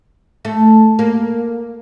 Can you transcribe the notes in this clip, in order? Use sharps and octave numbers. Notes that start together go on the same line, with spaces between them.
A3
A#3